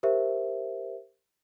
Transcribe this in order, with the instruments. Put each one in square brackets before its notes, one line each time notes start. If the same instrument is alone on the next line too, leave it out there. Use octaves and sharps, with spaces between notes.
[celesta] G4 A#4 C5 E5